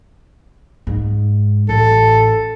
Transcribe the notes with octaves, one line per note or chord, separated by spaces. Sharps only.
G#2
A1 A4